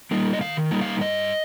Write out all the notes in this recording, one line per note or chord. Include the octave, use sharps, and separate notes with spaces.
G3 A#3 D#4
D#5
D#3 F5
G3 A#3 D#4
F5
G2 D#5